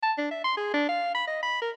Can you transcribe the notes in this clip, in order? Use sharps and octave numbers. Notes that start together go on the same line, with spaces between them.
A5
D4
E5
C6
G#4
D4
F5
B5
D#5
B5
A#4